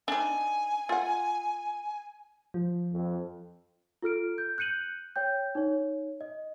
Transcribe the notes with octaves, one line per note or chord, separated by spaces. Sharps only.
D4 D#4 G#5
F4 F#5
F3
F2
F4 A4 F6 D7
G6
F#6 G6 C#7 D#7 F#7
C#5 G5 G6
D#4 C#5
D#5